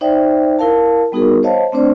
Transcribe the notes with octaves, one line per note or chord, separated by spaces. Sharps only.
D#4 C5 D5 E5 G5
E4 A#4 F5 A5
G3 B3 D#4 F#4 G#4 A#4
C5 C#5 D#5 F5 A5
A3 C4 D4 C5 D5